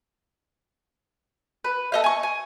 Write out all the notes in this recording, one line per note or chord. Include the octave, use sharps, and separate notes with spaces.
B4
A4 D#5 F5
G#5 C#6
G#5